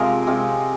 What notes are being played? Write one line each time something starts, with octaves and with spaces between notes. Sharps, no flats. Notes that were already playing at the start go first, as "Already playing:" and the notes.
Already playing: C3 F3 G#3 F4 G#4 A#4
C3 G#3 C4 F4